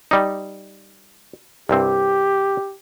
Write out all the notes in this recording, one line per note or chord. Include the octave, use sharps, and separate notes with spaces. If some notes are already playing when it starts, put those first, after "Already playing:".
G3 D#4
C2 G2 C4 G4